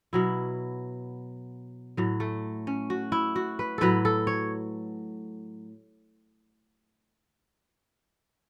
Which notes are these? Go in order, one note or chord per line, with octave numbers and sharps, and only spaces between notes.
B2 F#3 E4
A2 F#3
A3
C#4
F#4
E4
F#4
B4
A2 F#3 A4 B4
A4
C#5